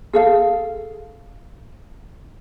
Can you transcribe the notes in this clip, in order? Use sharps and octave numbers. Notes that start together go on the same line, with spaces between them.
G#4 A4 F5